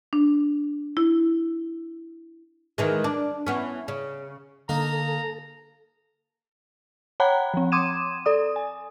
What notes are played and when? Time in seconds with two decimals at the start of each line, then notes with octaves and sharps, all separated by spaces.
0.13 D4
0.97 E4
2.78 D#3 E3 G#3
3.04 D4
3.47 E3 B3 C#4
3.88 C#3
4.69 D3 A#3 D#4 A4 A#5
7.20 C#5 F#5 G5 A#5 B5 F#6
7.54 F3 C4
7.72 C6 D6 D#6 G#6 D#7 E7
8.26 A4 D5 D#6
8.56 G#5